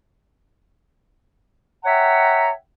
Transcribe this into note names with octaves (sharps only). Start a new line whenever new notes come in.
C#5 E5 F#5 G5 A#5